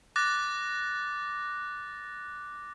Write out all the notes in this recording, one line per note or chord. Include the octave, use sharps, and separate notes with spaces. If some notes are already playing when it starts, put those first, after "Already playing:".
D6 F#6 A6 A#6